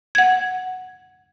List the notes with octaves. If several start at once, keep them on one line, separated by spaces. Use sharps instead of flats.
F#5 G#6